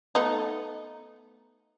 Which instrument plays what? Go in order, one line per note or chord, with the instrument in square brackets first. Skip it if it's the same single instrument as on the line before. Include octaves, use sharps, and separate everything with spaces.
[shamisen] A3 B3 D#4